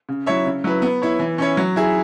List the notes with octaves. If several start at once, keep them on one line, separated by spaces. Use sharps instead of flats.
C#3
F#3 E4 C#5 E5
C#3
F#3 E4 B4
B3
E4 C#5
E3
C#4 E4 C#5
F#3
E4 G#4 E5